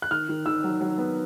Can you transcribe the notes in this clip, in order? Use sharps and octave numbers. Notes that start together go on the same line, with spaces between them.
F#6
D#3 F6
D#3
D#3 E6
F#3
F#3
B3